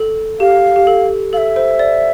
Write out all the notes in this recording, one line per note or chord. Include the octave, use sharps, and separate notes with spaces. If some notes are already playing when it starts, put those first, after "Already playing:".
Already playing: A4
G4 F5
G4
A4
A4 E5 F5
C5
D5